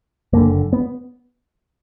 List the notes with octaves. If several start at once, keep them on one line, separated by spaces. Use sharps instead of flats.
F#1 F#2 D3 A#3
B3